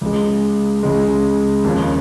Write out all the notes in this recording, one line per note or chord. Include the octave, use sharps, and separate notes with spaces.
C#2 C#3 G#3
C#2 C#3 G#3
D#2 C#3 F3